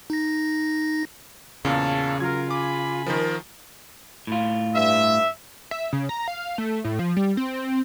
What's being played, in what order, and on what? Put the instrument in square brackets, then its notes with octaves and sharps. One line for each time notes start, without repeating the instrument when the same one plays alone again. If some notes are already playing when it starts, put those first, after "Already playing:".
[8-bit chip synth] D#4 A#6
[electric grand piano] E2 A#2 [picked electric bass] C#3 [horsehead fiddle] C#5 A5 [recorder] F5
[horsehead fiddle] F#3 A#4 [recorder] F4 [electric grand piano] G#6
[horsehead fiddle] G#5 B5 [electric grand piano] D6
[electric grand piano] D#3 F3 [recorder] A#4
[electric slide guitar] A2 F4
[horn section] G2 E5
[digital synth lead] E5
C#3
A#5
F5
A3
A2
F3
G3
C4